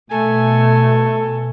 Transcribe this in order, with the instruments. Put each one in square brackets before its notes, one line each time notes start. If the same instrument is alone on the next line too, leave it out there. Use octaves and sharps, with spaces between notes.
[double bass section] B2 [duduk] A3 [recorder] A4 [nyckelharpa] G#5